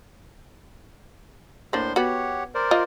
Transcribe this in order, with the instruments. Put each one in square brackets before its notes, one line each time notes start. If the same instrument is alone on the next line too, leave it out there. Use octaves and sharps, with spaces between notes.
[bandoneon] A2 C5 C6 [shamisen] A#3 D4
[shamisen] B3 F#4 [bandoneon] G4 C#5 F#5
[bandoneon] A#4 C5 D5
[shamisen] F4 D#5